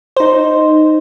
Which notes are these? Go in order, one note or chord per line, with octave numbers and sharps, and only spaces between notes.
D#4 C5